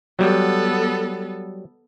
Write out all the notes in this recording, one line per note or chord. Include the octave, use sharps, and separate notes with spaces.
F#3 G3 B3 A4